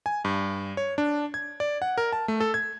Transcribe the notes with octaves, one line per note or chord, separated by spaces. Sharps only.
G#5
G2
C#5
D4
G#6
D5
F#5
A#4
A5
A3
A4
G#6